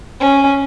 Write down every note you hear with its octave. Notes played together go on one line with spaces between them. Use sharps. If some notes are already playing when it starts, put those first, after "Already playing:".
C#4